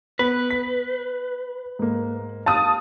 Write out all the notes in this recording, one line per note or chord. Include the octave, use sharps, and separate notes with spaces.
B3 B4
B6
G#2 A#3
F5 A5 D#6